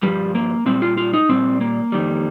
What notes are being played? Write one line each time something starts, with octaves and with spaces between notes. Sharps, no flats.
G2 F3 G3
A#3
A#2 G3 C4
F4
F4
D#4
A#2 G3 C4
A#3
F2 D#3 G3